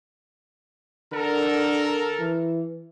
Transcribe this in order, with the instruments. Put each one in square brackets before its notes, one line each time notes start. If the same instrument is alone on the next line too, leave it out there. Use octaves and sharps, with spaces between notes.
[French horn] D3 [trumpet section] A4 A#4
[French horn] E3